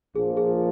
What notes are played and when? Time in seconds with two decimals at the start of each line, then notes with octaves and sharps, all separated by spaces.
0.15 A#1 A#2 F3 G#4
0.37 G#4